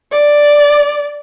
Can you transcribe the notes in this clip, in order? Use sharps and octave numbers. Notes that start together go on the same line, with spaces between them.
D5